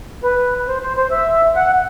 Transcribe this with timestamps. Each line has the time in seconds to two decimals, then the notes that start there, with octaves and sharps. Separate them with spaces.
0.23 B4
0.68 C5
0.83 C5
0.97 C5
1.11 E5
1.56 F#5